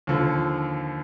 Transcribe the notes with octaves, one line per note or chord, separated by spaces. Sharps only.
D#2 D3 F3